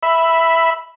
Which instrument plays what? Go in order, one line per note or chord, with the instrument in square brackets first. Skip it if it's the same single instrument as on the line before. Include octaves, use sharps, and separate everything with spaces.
[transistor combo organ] E5 B5